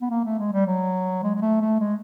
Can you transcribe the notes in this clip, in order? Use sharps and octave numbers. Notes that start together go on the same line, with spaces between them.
B3
A#3
A3
G#3
G3
F#3
G#3
G#3
A3
A3
G#3